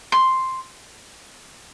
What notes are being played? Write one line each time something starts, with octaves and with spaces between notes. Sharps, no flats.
C6